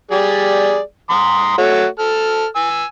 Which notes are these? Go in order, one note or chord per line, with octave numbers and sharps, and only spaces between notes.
G3 G#4 D5
A#5 C6 D#6
A3 F#4 C#5
A4 F6
G#5 E6